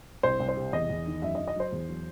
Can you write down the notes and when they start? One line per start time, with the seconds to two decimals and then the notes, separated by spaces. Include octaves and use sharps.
0.23 C2 C5
0.40 C2
0.48 C5
0.57 C3
0.73 E2 D#5
0.90 E2
1.06 D#3
1.22 F#2 E5
1.35 D#5
1.40 F#3
1.48 D#5
1.56 F#3 C5
1.72 E2
1.89 F#3